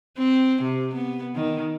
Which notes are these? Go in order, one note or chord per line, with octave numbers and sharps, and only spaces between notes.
C4
C3
B3
D#3